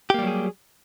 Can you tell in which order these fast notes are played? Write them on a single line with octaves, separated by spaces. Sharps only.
G4 A#3 G3 F#3 G#4